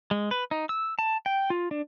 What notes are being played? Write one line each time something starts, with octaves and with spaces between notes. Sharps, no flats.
G#3
B4
D#4
E6
A5
G5
F4
D4